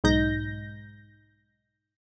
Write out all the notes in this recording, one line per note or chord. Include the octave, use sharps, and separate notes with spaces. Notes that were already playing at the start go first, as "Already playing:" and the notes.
B1 G#2 D#4 G6 A#6